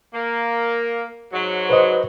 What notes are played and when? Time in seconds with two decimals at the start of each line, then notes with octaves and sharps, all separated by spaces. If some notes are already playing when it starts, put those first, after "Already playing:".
0.14 A#3
1.32 G#2 F#3
1.70 B4 C5 D#5